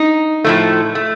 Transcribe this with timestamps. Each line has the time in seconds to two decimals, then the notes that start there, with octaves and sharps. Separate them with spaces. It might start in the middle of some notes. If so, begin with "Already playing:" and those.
Already playing: D#4
0.44 A2 F3 A3
0.95 A3